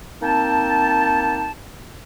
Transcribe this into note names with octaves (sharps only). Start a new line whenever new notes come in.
A#3 C4 D#4 G5 A5